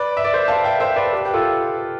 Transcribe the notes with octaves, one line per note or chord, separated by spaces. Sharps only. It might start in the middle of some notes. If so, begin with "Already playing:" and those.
Already playing: B4 D5
E5
D5
C5 E5
F5 A5
E5 G5
C5 E5
B4 D5
G4 B4
G4
F4 A4